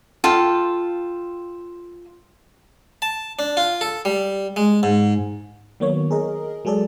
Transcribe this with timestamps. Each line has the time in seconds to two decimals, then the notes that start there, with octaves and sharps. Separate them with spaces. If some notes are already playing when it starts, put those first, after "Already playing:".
0.24 F4 A4 G5
3.02 A5
3.39 D4
3.57 F4
3.81 A4
4.05 G3
4.56 G#3
4.83 G#2
5.80 D#3 F#3 A#3 B3 C#5
6.11 G#4 A#4 D#5
6.65 F#3 G#3 G#4 A4 D5